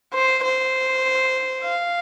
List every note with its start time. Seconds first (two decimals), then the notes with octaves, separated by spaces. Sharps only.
0.14 C5
0.44 C5
1.64 F5